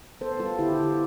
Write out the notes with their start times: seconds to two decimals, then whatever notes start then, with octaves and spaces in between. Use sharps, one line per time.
0.21 B3 A4 C5
0.40 G3 F4 A4
0.59 D3 E4 G4